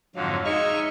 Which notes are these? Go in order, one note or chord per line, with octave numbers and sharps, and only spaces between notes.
F2 G#2 D3 F#3 F5
G#3 D#4 E5 C#6 F6